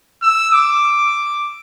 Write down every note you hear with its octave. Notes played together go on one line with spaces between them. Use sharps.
E6
D6